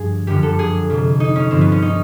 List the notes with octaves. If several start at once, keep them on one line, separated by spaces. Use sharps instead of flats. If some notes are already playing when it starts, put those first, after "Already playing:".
Already playing: G2 D3 F3 G#4
F#2 D3 F3 G4
A4
G#4
F2 C3 F3
D#4
C#4
G2 D3 F3 C4
B3
C#4
D#4